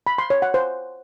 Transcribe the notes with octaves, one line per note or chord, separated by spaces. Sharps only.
B5
C6
C#5
F#5
C5